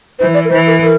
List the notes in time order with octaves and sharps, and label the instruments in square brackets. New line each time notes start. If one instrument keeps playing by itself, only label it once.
[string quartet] E3 [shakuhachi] C5
[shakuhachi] D5
A#4
[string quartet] E3 [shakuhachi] C5
[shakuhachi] A#4
A#4